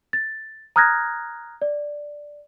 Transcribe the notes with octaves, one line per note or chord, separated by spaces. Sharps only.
A6
A#5 D#6 F6 F#6 G#6 A#6
D5